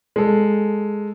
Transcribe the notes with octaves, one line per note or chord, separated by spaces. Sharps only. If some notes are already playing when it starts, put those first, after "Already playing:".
G#3 A4